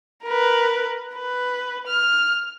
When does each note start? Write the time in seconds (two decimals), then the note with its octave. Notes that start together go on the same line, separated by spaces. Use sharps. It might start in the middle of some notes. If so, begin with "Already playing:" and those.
0.24 A#4 B4
1.16 B4
1.87 F6